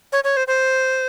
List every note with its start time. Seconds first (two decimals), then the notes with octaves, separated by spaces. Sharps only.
0.12 C#5
0.24 C#5
0.37 C5
0.47 C5